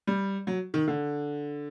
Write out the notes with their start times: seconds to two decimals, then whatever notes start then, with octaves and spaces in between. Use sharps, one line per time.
0.07 G3
0.47 F#3
0.74 D#3
0.88 D3